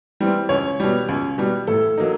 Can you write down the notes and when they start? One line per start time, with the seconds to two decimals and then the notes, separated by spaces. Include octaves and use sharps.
0.20 E3 G3 C4
0.49 C#2 C#5
0.80 B2 G3
1.08 C#2
1.38 B2 G3
1.67 A2 A4
1.98 F#3 A#3 D#4